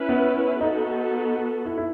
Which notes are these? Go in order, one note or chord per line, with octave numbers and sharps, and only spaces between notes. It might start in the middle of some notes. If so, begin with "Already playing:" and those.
Already playing: C#4 E4 B4
B3
B3 D#4 F#4 A4
E4
E4